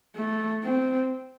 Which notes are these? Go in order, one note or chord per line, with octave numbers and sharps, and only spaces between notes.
A3
C4